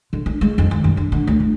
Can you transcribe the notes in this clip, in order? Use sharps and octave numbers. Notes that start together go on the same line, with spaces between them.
D3
D4
G#3
F2
D#3
F#2
D3
D3
D2
G1